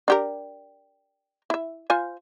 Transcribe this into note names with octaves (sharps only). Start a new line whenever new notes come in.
D4 G4 A#4
E4 E5
F4 C5 G#5